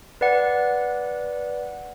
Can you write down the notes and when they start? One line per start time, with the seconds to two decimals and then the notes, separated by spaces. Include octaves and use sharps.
0.21 B4 D5 F#5